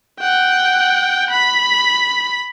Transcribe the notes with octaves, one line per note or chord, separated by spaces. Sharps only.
F#5 G5
B5